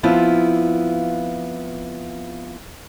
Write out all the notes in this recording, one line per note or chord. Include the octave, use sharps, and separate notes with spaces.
F3 B3 C4 E4 F4